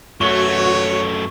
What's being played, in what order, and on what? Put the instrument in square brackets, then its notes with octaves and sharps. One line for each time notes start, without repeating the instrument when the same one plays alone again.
[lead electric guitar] F#2 A3 [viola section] F#4 [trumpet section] C#5 [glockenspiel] C#6